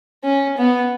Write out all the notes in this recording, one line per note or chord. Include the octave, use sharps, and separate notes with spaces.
C#4
B3